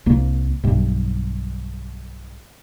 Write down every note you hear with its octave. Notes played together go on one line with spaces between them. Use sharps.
C2 A#3
B1 G2